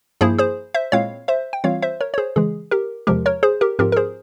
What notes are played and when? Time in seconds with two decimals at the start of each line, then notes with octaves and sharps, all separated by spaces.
0.21 G2 F3 A#3 E4 G#4 C5
0.38 G#4 C5
0.74 C5 E5
0.92 A#2 G#3 C4 E4 C#5 F5
1.28 C5 E5
1.53 G5
1.64 E3 G3 C4 F4 C#5 F5
1.82 C5 E5
2.01 A#4 C#5
2.14 C#5
2.18 G#4 C5
2.36 C#3 E3 G#3 G#4
2.71 G4 A#4
3.07 E2 C3 F3 G#3 G4 A#4
3.26 A#4 C#5
3.43 G#4 C5
3.61 G4 A#4
3.79 G#2 F3 C4 F4 G4 A#4
3.92 A#4
3.96 G#4 C5